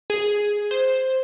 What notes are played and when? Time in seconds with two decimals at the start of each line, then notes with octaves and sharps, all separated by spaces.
0.10 G#4
0.71 C5